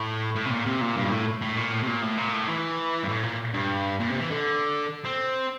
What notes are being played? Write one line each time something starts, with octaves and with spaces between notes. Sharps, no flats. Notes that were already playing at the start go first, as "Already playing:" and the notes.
Already playing: A2
A2
C3
A#2
C3
A#2
G2
A#2
A2
A2
A#2
A2
C3
A#2
A2
A#2
A2
E3
G2
A2
A#2
G2
A#2
C3
E3
D3
C4